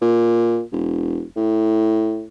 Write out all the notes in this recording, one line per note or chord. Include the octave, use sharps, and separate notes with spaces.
A#2
E1
A2